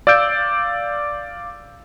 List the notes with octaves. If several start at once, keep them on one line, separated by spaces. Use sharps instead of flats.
D5 F5 E6 G6 D7